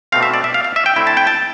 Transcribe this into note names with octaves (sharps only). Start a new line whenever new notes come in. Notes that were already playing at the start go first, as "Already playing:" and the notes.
B2 A3 C4 F5
E5
D5
E5
F5
F5
E5
G5
D3 A3 C4 E4
A5
G5
A5